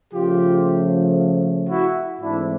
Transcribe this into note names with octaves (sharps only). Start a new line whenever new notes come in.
C#3 F3 A3 F4 G4
E4 F#4
G#2 E3 A3 C4 D4 E4